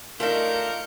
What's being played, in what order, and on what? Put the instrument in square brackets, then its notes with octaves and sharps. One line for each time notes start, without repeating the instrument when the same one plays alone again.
[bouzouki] A3 D4 D#4 [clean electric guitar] F4 [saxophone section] A#4 [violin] G6 C#7